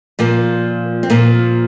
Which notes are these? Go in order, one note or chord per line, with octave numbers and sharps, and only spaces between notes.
A#2 F3 A#3
C4
A#2 F3 A#3